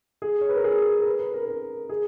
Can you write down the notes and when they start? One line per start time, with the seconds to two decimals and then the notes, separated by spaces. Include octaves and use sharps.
0.22 G#4
0.41 C#5
0.49 B4
0.56 A#4
0.64 G#4
1.01 A#4
1.06 B4
1.19 B4
1.34 A#4
1.47 A#4
1.89 G#4